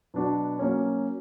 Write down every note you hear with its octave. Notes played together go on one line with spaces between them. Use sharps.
B2 F#3 B3 D4 F#4
F#3 A#3 C#4